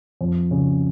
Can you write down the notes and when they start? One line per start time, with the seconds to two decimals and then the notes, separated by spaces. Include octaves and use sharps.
0.21 F2
0.51 C#3